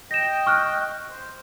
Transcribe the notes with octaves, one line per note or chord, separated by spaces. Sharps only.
D#5 G5 A#6 E7
C#6 F6 F#6
C5